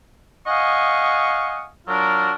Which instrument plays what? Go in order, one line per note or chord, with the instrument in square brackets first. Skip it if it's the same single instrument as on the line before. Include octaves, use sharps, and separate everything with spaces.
[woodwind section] D#5 F5 F#5 G#5 C#6 D#6
F#3 D4 F4 F#4 A#4